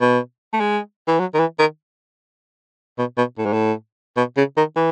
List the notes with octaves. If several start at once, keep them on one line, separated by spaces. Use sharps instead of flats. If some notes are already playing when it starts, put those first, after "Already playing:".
B2
A3
G#3
E3
F#3
D#3
E3
D#3
B2
B2
A2
G#2
A2
B2
C#3
D#3
E3